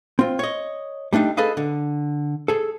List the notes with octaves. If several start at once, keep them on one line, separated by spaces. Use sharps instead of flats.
C4 F4
C#5 D#5
G3 A3 D4 D#4
G#4 A4 B4 D#5 F5
D3
G#4 A4